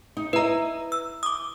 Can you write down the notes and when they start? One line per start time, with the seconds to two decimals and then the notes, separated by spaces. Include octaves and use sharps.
0.17 D#4
0.33 E4 B4 D#5 A#5
0.92 E6
1.23 D6 D#6